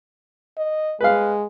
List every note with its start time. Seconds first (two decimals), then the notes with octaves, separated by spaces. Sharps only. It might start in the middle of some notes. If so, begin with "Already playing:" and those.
0.58 D#5
1.01 G#3 B4 F5